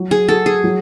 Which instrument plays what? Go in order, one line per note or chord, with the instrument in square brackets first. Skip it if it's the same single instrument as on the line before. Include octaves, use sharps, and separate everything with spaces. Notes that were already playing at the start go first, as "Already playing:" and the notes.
Already playing: [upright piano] F#3
[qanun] G#4
[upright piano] F#4 [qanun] A4
[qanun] G#4
[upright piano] F#3